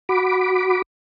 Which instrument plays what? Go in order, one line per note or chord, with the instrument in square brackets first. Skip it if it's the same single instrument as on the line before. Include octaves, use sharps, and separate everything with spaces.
[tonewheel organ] F#4 B5 D6